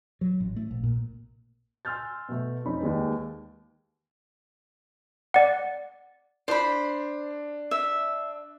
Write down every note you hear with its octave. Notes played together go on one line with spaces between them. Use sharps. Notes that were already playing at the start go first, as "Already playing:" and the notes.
F#3
A1
A3
A#1
A#2
G#5 C6 E6 F6 G6 A6
B2 A3
F2 C#4 D#4 B5
D#2 D#3 G#3 A#3 B4
D5 F#5
D4 C5 B5
E5